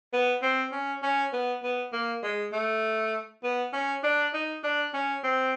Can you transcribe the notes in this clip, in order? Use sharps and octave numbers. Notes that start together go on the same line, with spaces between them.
B3
C4
C#4
C#4
B3
B3
A#3
G#3
A3
B3
C#4
D4
D#4
D4
C#4
C4